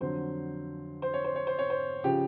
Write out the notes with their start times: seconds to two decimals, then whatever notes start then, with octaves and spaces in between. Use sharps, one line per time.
0.01 F2 D3 F#3 C5
1.02 C5
1.14 C#5
1.25 C5
1.36 C#5
1.47 C5
1.59 C#5
1.70 C5
2.04 C#3 F3 G4